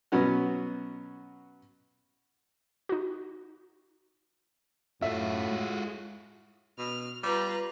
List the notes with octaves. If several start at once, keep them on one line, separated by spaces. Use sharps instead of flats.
B2 F#3 B3 C#4 F#4
D#4 F#4
F#2 A2 F4 F#4 E5
G#3
B2 F6
G3 F4 B4 A#5